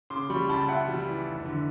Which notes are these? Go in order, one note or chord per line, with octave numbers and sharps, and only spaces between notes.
C#3 C6 D6
G3 B5 C#6
C#2 A5 B5
C#2 E5 F#5
G3
E3
F1
D3